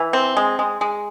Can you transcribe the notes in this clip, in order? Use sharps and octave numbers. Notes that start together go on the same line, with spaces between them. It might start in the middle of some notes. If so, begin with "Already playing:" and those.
Already playing: E3
C4
G#3
G#3
G#3